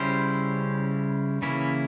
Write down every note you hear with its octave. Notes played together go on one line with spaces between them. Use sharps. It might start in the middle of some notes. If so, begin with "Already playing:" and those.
Already playing: C#3 G3 C#4 E4 C5
C#3 E3 A#3 C#4 E4